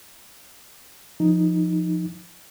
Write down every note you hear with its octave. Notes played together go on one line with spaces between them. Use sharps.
F3 D#4